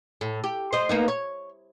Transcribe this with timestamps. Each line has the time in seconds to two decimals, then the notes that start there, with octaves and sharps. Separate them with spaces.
0.21 A2
0.44 G4
0.73 C5 D#5
0.89 A#3 B3 D#4
1.08 C#5